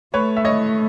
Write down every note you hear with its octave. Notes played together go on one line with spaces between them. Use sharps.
A3 B4 C#5
E5
C#5 D#5